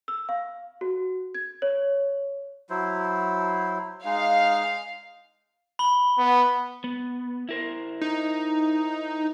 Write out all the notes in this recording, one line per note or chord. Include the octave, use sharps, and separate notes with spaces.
E6
F5
F#4
G#6
C#5
F#3 E4 C5
G#3 D#4 F5
B5 G7
B3
B3
E4 A#4 C5
D#4